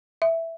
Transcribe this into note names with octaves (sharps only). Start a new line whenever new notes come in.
E5